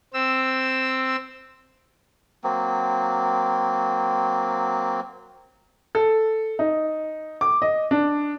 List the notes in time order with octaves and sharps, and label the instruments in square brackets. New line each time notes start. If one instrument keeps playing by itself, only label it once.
[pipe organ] C4 E6
[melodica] F#3 A#3 C4
[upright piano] A4
D#4
D6
D#5
D4